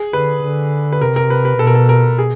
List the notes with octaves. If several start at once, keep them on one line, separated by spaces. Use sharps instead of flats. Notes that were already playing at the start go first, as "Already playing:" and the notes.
Already playing: G#4
D3 B4
D3
B4
C3 A#4
A#4
B4
B4
B2 A4
A#4
A4
A#4
G#4